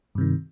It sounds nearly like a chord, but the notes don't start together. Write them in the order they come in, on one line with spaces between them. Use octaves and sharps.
G2 C3 D#3